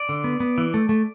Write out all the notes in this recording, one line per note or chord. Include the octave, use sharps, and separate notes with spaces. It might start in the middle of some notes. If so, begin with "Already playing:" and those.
Already playing: D5
D3
B3
B3
E3
A3
A3